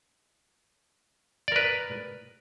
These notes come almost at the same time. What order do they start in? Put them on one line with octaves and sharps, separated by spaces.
D5 A#4 B4